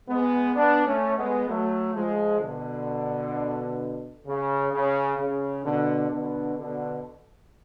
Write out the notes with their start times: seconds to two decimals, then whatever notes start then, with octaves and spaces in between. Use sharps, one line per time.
0.08 G#3 B3
0.55 B3 D4
0.86 A3 C#4
1.17 G#3 B3
1.48 F#3 A3
1.94 F3 G#3
2.40 B2 D3
4.26 C#3
4.72 C#3
5.18 C#3
5.65 B2 D3
6.11 B2 D3
6.58 B2 D3